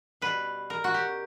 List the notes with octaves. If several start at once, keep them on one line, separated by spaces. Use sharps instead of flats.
B2 G3 B4
A#4
F#4
G4